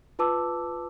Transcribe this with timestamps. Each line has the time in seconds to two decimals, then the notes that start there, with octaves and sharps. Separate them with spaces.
0.19 F4 B4 A5 D6 E6